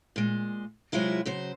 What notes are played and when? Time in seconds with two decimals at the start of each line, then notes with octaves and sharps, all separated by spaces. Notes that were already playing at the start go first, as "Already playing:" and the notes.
0.16 A#2 G#3
0.92 C3 F#3 G#3 E4 F4 G#4
1.25 C#3 F#3 C5